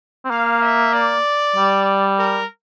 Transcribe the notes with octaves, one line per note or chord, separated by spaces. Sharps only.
C4
A#3 F5
E5
D5
G3
A#4